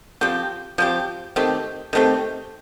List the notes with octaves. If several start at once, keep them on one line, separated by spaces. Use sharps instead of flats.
F3 C4 G4
F3 C4 G4
D#3 A3 C4 G4
D#3 A3 C4 G4